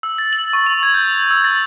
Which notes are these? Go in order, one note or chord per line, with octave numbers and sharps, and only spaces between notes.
E6
A6
F#7
C#6
F7
G#6
G6
E6
A6